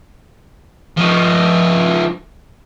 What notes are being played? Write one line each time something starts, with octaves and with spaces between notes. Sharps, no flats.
F3 D#4